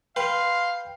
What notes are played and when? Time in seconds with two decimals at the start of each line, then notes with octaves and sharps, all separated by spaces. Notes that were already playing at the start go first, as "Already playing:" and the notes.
0.16 B4 F5 G5 C6